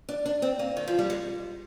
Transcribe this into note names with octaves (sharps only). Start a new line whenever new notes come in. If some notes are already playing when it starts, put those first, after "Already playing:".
D4
D4
C4
A#3
D#3
F3
G3
G#3